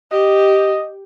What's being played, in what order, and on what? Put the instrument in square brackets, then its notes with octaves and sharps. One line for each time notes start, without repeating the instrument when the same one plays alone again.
[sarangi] G4 [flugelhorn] D#5